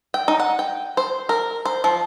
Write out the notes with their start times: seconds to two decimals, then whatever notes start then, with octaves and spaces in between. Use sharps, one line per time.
0.14 G5
0.28 D#4
0.40 F#5
0.59 G5
0.97 C5
1.29 A#4
1.65 C5
1.84 F3